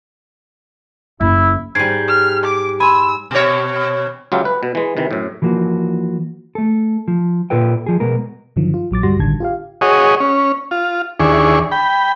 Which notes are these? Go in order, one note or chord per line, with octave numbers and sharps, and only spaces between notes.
F#1 E4
G#2 G3 G#6 C7 D7
F6
D6
G#5 B5 C6 E6
B2 C#5
C#2 F#3 F4 G4 E5
B4
B2
E3 G#3
C3 D#3 E3
F#2 A2
E3 F3 A#3 F#4
A3 A4
F3
A#2 F4 A4 B4 G5
F3 G#4
B2 G#3 B3 A#4
G2 D3 D#3 F3 F#3
F4
A#1 F#3 D6 A6
D2 G2 G3 F#4 C6 A#6
A1 D3 D#3 A5 G#6
F4 G4 F5
F#4 G#4 C#5 D#5
C#4
F4
D#2 E3 D4 G#4 C#6
G5 B5